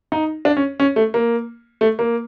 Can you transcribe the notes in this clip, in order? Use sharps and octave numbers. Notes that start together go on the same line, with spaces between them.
D#4
D4
C#4
C#4
A3
A#3
A3
A#3